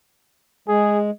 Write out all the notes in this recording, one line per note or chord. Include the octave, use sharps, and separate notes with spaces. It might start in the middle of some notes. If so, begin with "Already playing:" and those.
G#3 G#4